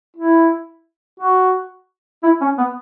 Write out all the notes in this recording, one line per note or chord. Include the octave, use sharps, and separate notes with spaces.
E4
F#4
E4
C#4
B3